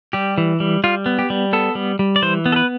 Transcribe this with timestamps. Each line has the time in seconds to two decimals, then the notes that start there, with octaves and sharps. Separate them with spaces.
0.13 G3 G4
0.38 E3
0.60 G3
0.84 G3 F4
1.06 B3
1.19 G4
1.30 G3
1.53 B3 A4
1.75 G3
1.99 G3
2.16 D5
2.22 E3 C5
2.46 B3
2.52 A4
2.56 B4